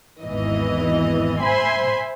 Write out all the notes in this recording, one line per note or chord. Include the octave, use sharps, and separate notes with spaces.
G#1 E2 G#2 E3 D#5
C5 E5 G#5 B5 C6